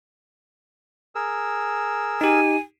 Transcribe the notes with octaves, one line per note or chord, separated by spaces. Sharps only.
G#4 A#4 E6
D#4 G4 G#5